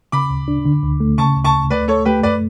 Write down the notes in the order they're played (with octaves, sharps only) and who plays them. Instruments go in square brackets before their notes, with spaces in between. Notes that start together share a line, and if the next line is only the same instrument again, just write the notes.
[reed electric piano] C#3 [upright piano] B5 D6
[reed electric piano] D2
D4
D3
D2
A3
[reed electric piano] C#3 [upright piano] A5 C#6
[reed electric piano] D2
[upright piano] A5 C#6
[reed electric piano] D2
[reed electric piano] A3 [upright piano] B4 D5
[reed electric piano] A3 [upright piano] A4 C#5
[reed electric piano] A3 [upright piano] G4 B4
[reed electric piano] F#2 [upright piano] B4 D5